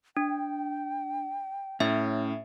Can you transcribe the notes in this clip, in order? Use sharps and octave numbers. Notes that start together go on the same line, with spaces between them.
D4 G5
A2 C#4 E5